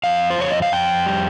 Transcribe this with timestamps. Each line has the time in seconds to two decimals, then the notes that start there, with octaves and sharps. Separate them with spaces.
0.04 F2 F5
0.30 C5
0.38 F2 C#5
0.51 D#5
0.62 F5
0.72 F2 G5
1.06 G3